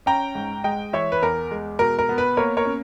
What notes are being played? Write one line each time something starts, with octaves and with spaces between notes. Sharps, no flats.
C#4 G5 A#5
G#2
G#3 D#5 G5
E3 C#5 E5
B4
E2 A#4
G#3
B2 A#4
A#4
B3
B4
A#3 A#4 C#5
A#4 C#5
C#4